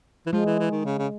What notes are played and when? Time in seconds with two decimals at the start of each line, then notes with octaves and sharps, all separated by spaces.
0.26 E3
0.32 F3 G#3
0.45 E3
0.59 E3
0.72 D#3
0.85 C#3
0.98 C#3